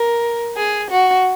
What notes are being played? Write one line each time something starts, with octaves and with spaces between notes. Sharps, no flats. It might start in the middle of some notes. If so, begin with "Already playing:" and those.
Already playing: A#4
G#4
F#4